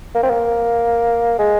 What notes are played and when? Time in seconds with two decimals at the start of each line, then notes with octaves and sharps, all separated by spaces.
0.15 A#3
0.23 C4
0.30 A#3
1.39 G#3